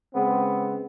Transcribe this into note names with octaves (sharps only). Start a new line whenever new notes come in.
C#3 G#3 B3 C4